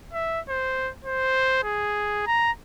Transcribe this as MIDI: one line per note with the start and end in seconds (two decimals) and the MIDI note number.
0.13 0.40 76
0.49 0.90 72
1.04 1.64 72
1.64 2.26 68
2.26 2.51 82